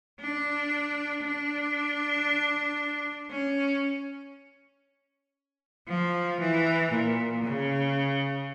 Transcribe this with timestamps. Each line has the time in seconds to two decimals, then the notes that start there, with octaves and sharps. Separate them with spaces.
0.20 D4
1.23 D4
3.30 C#4
5.88 F3
6.40 E3
6.91 A#2
7.44 C#3